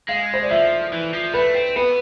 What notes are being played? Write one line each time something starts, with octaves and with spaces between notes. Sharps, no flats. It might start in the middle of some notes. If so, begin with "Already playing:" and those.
G#3 F5
C5
D5
F3 E5
E3
F3
A3 B4
C4
B3 B4